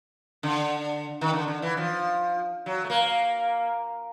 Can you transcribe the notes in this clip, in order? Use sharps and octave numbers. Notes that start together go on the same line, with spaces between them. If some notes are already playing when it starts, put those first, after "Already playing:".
D3
D#3
D3
D3
E3
F3
F#3
A3
A#3